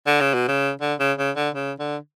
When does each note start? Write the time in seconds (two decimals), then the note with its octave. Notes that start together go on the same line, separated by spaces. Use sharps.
0.07 D3
0.21 C#3
0.34 B2
0.48 C#3
0.81 D3
0.99 C#3
1.18 C#3
1.36 D3
1.55 C#3
1.79 D3